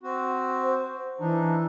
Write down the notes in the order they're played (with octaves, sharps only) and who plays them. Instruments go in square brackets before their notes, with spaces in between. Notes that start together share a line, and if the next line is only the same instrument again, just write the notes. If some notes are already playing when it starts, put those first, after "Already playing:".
[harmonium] C4 F#4
[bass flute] C5
[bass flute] E3 [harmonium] D4 D#4